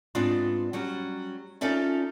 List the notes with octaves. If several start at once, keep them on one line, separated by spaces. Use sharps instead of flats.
G#2 B3 C4 D4 F4
F#3 G3 C#4
C#4 D#4 F4 A4 D5 E5